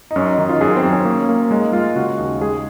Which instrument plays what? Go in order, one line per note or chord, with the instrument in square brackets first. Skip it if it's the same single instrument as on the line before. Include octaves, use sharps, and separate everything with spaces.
[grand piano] D#4
[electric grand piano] F#2 [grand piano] C#4
[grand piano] D#4
[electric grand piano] D#3 [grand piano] D#4
[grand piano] F4
[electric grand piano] F#2 [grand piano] G#4
[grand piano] C4
[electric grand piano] F#2
[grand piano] C#4
[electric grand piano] A#3
A#3
[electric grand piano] G#3 [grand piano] D#4
[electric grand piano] G#3 [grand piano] F4
[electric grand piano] C#3 [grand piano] F#4
[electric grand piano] D#2
[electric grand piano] G#3 [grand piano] G#4